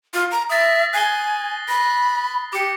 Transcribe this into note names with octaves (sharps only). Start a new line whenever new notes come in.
F4
A#5
E5 D#6 A6 A#6
G#5 F#6 C7 G7
B5 A#6
G4 D6 C#7